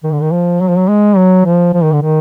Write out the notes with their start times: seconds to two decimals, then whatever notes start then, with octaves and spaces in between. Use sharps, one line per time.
0.03 D#3
0.12 D3
0.21 D#3
0.31 F3
0.60 F#3
0.69 F3
0.78 F#3
0.88 G#3
1.17 F#3
1.45 F3
1.74 F3
1.83 D#3
1.93 D3
2.02 D#3